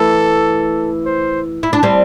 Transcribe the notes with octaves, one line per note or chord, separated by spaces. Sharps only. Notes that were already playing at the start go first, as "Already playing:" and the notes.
Already playing: E3 A3 A4
C5
E4
D4
G3 C4